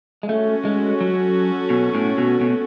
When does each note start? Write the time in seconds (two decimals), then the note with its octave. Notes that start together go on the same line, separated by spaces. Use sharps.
0.23 G#3
0.29 A3 C#4 F#4 A4
0.65 G#3
1.01 F#3
1.70 B2
1.95 A2
2.18 B2
2.41 B2